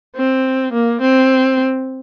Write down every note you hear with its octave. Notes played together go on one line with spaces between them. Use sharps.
C4
A#3
C4